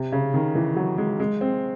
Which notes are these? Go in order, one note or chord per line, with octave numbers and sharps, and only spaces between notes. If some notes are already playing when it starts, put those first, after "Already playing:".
Already playing: C3
C#3
D#3
E3
F#3
G#3
G#3
C4